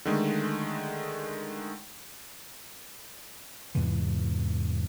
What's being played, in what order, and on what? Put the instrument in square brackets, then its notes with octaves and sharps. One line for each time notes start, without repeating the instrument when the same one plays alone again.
[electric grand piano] D3 D#3 G#3 A3
[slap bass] E2 G#2 C3 E3